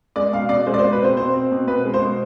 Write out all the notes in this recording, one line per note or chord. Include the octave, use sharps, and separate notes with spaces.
G#3 D5
B2 F5
B2 D5
G#3 C5
D5
C5
B2
B4
C4 C5
B2 C5
C4
B2
B2 B4
G#3
C5
B2